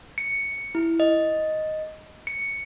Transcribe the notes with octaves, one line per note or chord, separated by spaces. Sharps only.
C#7
E4
D#5
C#7